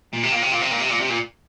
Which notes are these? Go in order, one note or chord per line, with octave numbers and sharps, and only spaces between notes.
A#2
C3
A#2
C3
A#2
C3
A#2
C3
A#2
C3
A#2